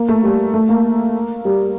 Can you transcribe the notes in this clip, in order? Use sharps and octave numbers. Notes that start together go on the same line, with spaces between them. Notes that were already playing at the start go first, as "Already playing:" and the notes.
Already playing: A#3
A3
G3
A3
A#3
G3